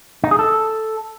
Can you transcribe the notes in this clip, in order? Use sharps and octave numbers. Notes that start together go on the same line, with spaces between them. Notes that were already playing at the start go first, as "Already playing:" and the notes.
D#4
G#4
A4